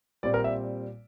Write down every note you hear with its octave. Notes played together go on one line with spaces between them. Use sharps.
A#2 G3 C4 D5
A#4
E5